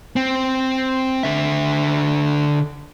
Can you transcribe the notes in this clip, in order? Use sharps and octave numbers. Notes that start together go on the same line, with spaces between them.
C4
D3 E5